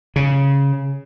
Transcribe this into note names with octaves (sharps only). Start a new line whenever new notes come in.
C#3